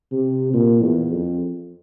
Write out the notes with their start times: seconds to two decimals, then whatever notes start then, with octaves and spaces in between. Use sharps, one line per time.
0.11 C3
0.54 A#2
0.83 E2
1.11 F2